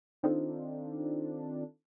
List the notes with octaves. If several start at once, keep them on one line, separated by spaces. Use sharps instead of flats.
D#3 C4 D4 D#4 F4 A4